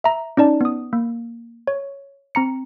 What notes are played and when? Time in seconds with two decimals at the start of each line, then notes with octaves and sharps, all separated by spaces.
0.04 E5 A#5
0.37 C#4 D#4 D5 A5
0.61 B3 D#6
0.93 A#3
1.67 C#5
2.35 C4 A#5 C#7